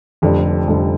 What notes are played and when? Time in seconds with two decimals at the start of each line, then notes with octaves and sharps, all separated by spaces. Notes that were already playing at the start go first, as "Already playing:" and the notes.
0.22 F1 F2 D3 G3 D4
0.67 F1 F2 D3 G3 D4